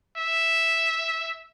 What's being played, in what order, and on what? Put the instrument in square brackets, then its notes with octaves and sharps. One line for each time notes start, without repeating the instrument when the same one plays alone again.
[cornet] E5